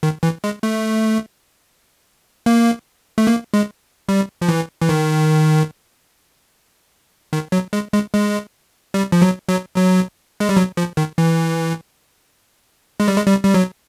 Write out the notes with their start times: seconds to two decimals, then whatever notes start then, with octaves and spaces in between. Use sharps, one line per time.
0.03 D#3
0.23 E3
0.44 G#3
0.63 A3
2.46 A#3
3.18 A3
3.27 A#3
3.54 G#3
4.09 G3
4.41 F3
4.48 E3
4.82 E3
4.89 D#3
7.33 D#3
7.52 F#3
7.73 G#3
7.93 G#3
8.13 G#3
8.94 G3
9.12 F3
9.22 F#3
9.48 F#3
9.76 F#3
10.40 G#3
10.49 G3
10.57 F#3
10.77 F3
10.97 D#3
11.18 E3
13.00 G#3
13.08 G3
13.16 G#3
13.27 G3
13.43 G3
13.54 F#3